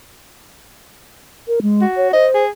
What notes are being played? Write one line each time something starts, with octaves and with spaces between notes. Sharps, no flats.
A#4
G#3
F#4
C#5
C5 D#5
G#4